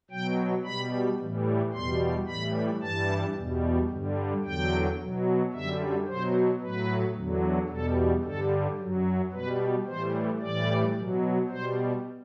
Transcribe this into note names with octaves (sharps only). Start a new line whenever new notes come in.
B2 F#3 G5
B2 G3 B5
A2 E3 G3
E2 B2 G3 C6
A2 E3 G3 B5
G2 E3 G3 A5
E2 B2 G3
G2 D3 G3
E2 D3 F#3 G5
B2 F#3
F#2 D3 G3 E5
B2 F#3 C5
A2 F#3 B4
E2 D3 F#3
E2 B2 G3 A4
G2 D3 G3 A4
F#2 F#3
B2 G3 B4
A2 E3 G3 C5
A2 E3 G3 D5
B2 F#3
B2 G3 C5